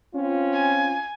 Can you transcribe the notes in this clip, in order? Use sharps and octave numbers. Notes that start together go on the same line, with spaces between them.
C4 C#4 F4
G#5